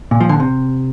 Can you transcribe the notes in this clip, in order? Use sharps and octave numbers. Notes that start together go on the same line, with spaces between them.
A#2
F3
D3
C3